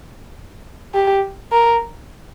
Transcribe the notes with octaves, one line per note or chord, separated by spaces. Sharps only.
G4
A#4